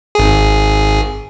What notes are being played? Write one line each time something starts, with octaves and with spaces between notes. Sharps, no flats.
G#1 G#4